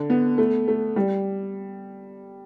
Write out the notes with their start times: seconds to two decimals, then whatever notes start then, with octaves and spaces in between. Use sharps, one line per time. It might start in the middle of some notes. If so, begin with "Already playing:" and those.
Already playing: D3
0.10 B3
0.38 A3
0.68 A3
0.96 G3